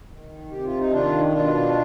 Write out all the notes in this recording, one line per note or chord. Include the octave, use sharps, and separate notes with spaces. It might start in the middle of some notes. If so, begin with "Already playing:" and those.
D#3
C3 G4
F4
D#4
D#3 D4 F4
B2 D4 F4